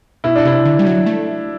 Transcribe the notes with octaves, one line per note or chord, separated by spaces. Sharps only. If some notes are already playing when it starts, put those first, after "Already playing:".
B2 E4
D4
C3 E4
D3
G3
F#3
A3